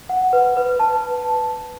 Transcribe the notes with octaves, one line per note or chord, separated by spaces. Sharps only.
F#5
B4
B4
A5